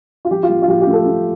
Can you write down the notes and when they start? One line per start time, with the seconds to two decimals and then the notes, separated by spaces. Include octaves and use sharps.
0.25 F4
0.31 F3 G4
0.43 F4
0.50 F3
0.62 F4
0.68 F3 G4
0.81 G4
0.87 A3
0.93 A4
1.06 A3